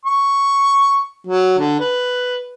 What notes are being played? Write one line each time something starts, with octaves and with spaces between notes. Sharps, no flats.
C#6
F#3
D3
B4